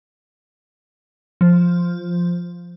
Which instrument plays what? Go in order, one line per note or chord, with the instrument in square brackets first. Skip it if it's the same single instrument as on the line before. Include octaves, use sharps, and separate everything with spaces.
[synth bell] F3